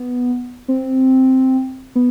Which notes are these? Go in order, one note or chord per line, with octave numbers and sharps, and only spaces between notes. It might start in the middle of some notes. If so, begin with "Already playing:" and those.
Already playing: B3
C4
B3